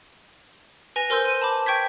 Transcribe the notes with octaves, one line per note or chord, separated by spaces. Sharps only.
B4 G#5 A#6 F7
A#4 C5 C6 E6 G6
D#7
A5 B5 D6
G5 C#6 G6 G#6 B6